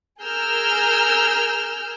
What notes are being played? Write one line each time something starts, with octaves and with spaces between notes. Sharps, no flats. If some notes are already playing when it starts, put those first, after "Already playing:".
G#4 A#4 E6 F6 G6